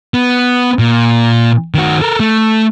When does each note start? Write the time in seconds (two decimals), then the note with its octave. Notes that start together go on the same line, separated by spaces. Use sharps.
0.14 B3
0.79 A#2
1.74 D#3 F#4
2.02 A4 A#4
2.20 A3